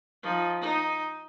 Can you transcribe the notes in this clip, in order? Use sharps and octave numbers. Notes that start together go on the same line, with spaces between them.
F3 D#4
D#4